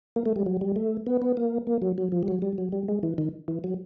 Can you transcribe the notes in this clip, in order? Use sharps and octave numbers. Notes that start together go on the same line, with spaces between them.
A#3
A3
G3
F#3
G3
A3
B3
B3
A#3
A#3
F#3
F#3
F3
G3
F#3
G3
F#3
G3
G#3
E3
D#3
E3
F#3